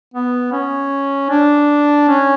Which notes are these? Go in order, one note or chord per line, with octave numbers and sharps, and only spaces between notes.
B3
C#4
D4
C#4